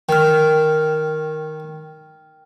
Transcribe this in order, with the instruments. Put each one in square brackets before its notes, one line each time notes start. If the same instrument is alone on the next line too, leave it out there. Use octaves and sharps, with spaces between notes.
[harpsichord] D#3 [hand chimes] G5 F6